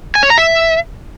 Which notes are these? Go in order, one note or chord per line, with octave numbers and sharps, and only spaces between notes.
G#5
C#5
A#5
E5